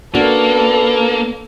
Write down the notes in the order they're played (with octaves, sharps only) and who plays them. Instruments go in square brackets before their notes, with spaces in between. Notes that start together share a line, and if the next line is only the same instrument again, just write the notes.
[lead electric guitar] A#3 [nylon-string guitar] C#4 D4 F#4 [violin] A4 [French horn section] B4